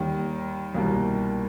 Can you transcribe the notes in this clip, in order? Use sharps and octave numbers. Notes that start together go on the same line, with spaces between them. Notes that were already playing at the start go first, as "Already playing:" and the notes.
Already playing: D#2 D#3 G3
C2 B2 G3 A#3